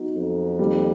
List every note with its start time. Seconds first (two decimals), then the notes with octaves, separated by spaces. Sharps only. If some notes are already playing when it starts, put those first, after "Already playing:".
Already playing: F#3 B3 D#4 F#4
0.16 F2
0.59 D#3 G3 A#3